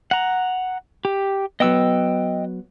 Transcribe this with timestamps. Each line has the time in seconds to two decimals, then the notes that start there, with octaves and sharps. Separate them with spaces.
0.11 F#5 A#5
1.05 G4
1.60 F#3 B3 D#5 G5 E6